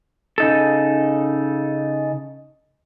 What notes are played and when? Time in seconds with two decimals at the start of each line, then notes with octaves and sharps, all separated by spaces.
0.38 C#3 D#4 A4